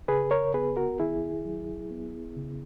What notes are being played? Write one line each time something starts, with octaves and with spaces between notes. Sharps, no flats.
C#3 G#4 B4
A#4 C#5
B3 G#4 B4
F#4 A#4
D#3 E4 G#4
F#3
B3
C#3